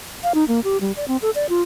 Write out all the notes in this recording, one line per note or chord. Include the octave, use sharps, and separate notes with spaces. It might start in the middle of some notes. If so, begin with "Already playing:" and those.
F5
D#4
A#3
G4
G3
D5
C4
A4
D5
F4